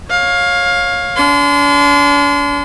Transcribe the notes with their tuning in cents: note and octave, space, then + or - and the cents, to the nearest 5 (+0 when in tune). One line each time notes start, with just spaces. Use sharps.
C#5 -10 F5 +15
D4 -45 C6 -30